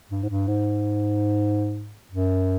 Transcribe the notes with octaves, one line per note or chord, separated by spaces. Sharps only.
G2
G#2
G2
G#2
F#2